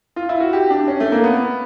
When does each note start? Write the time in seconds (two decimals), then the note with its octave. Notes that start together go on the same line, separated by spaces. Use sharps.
0.16 F4
0.29 E4
0.40 F#4
0.53 G4
0.70 D4
0.88 C#4
1.00 A3
1.12 A#3
1.24 B3